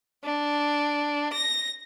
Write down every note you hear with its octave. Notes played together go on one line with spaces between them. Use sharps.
D4
A#6